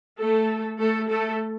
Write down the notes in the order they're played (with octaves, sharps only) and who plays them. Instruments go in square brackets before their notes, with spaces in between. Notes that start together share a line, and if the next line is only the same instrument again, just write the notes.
[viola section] A3 A4
A3 A4
A3 A4